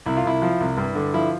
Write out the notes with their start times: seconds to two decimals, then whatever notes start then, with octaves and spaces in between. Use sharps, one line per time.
0.06 C2 E4
0.17 F4
0.24 C2 E4
0.42 F3
0.60 C2
0.77 G2
0.95 D3
1.14 F3 E4